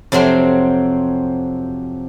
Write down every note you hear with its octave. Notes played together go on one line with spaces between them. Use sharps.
F2 C3 F#3 C4 C6